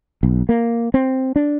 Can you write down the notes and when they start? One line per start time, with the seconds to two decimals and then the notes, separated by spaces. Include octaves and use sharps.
0.23 B1
0.49 A#3
0.94 C4
1.36 D4